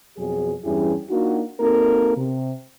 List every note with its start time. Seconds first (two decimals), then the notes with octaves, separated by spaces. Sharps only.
0.18 F2 B2 F#3 G#4
0.64 E2 G2 C#4 E4 G4 G#4
1.10 A#3 D4 D#4 F4 F#4
1.60 A#3 C4 D#4 F#4 A4 A#4
2.16 C3